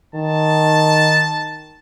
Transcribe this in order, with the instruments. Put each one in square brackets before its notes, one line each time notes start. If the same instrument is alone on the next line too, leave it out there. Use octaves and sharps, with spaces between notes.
[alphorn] D#3 [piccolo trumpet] A5